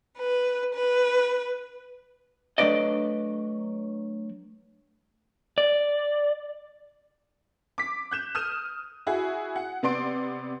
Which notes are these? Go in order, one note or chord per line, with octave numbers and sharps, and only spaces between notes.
B4
B4
F#3 A3 D4 B4 D5 D#5
D5
D6 B6
F#6 G6 E7
D#6 F6 G6 D#7 E7
E4 F#4 G#4
F#5
C3 B3 D5 C6 D7